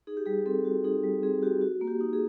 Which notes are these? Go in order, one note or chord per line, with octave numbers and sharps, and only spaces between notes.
D#4 G#4
G4
G3 G#4
C4 A4
F#4
D#4 G#4
G3
C4 G#4
F#4 G4
F#4
A#3
G4
D#4
G#4